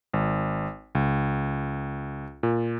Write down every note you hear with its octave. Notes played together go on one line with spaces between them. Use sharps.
G#1
C#2
A#2